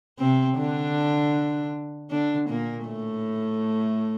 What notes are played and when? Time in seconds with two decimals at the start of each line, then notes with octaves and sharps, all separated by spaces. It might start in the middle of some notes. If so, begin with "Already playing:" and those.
0.19 C3 C4
0.57 D3 D4
2.10 D3 D4
2.49 A#2 A#3
2.87 A2 A3